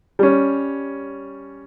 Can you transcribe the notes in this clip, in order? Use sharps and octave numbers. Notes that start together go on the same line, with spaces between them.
G3 C#4